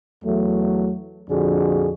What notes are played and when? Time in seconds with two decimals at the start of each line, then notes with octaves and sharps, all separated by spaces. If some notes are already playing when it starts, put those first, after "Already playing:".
0.24 E2 F#3 A3
1.30 A#1 F2 D3 F#4 G#4